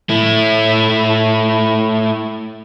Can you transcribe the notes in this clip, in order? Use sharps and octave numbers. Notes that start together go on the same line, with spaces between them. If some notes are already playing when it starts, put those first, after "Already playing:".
A3 E4